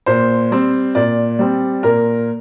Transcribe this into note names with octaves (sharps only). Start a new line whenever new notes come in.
A#2 C5
G3 C4
A#2 D5
G3 C4
A#2 A#4